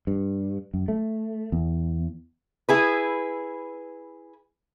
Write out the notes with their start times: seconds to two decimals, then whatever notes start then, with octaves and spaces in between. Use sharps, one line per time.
0.07 G2
0.74 F#2
0.88 A3
1.52 E2
2.69 E4 G#4 B4